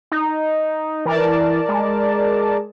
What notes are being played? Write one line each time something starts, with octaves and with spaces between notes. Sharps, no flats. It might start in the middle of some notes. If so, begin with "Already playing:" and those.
D#4
E3 A#4 D5 A5
G#3